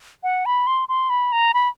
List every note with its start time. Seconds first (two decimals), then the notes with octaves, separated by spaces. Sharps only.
0.23 F#5
0.46 B5
0.67 C6
0.89 C6
1.10 B5
1.32 A#5
1.54 B5